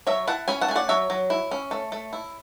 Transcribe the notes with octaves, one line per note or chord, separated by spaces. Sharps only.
F#3 C#5 E5
E4 F#5 A5
C#4 G#5 B5
F#5 A5
A3 G#5
D5 F#5
F#3 C#5 E5
F#3
E4
C#4
A3
A3
E4